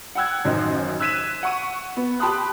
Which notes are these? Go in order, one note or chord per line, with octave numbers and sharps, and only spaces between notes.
F#5 G5 E6 F#6 G#6
A1 F#2 D#3 C5 D#5 C6
E6 F#6 G#6 B6 D#7 E7
F#5 C#6 D#7
B3
G4 A5 B5 C6 D#6 F#6